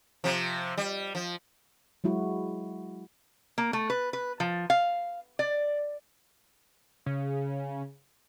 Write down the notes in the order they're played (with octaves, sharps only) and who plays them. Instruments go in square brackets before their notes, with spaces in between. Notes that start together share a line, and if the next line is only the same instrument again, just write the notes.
[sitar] C3 F3
G3
F3
[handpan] F#3 G#3 E4 F#4
[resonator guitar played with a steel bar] A#3
A3
B4
B4
F3
F5
D5
[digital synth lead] C#3